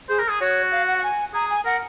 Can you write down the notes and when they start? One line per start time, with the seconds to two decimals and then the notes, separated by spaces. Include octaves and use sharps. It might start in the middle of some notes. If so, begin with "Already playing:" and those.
0.09 G#4 C5
0.19 A#4
0.29 G#4
0.41 F#4 C#5
0.72 F5
0.87 F#5
0.98 F#5
1.03 G#5
1.34 G#4 A#5
1.50 G#5
1.65 A#4 F#5